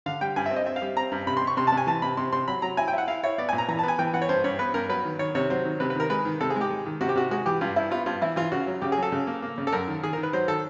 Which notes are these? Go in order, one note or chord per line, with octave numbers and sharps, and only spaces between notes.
D3 F5
G3 G5
G2 G#5
E5
C4
D#5
C4 E5
F5
G3
C4 A#5
G2
C3 B5
C6
C3
C#6
C3 C6
A5
C3
G#5
E3 A5
C3 B5
C3 C6
C3 C6
F#3 B5
F#3 A#5
E4 G#5
G5
E4 F#5
E4 F5
E4 C#5
B3 D5
G#5
A#2
A#5
E3 A#5
A5
B3 G#5
E3 G5
E3 F#5
C#5
G2 C5
G2 C#5
B3 B4
G2 A#4
F#3 B4
D#3
D#3 C#5
C3 C#5
F#3 C5
D#3
C3 B4
B4
D#3 A#4
G#3 B4
D#3
C3 A4
G#4
G#3
G4
G#3
D#3
C3 F#4
G4
C3 F#4
G#3 F#4
E3 G4
G2 F4
G2 E4
B3 F4
G2 F4
E3 E4
E3 F4
C#3 F#4
F#3
C#3 G4
G#4
F#3
A4
C#3
A#3
A#3
C#3
A4
F#2 A#4
D#3
D#3 G#4
A#4
D#3
B4
F#3 C5
D#3 A4